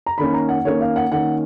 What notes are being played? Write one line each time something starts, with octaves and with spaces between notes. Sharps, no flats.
A#5
D#3 A#3 C#4 B5
A#5
F#5
D#3 A#3 C#4 C#5
F5
F#5
D#3 A#3 C#4 F#5